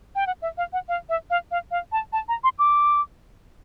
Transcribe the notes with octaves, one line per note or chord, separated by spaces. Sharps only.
G5
F#5
E5
F5
F#5
F5
E5
F5
F5
F5
A5
A5
A#5
C6
D6